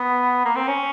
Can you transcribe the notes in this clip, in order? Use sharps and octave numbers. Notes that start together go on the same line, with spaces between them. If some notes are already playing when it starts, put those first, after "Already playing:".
Already playing: B3
A#3
C4
C#4